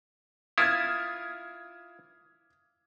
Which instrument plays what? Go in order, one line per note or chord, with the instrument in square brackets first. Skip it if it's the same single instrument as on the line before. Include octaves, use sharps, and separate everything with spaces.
[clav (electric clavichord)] E4 F4 [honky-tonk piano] D#6 F6 G#6